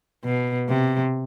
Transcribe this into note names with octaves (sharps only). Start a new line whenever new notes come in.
B2
C3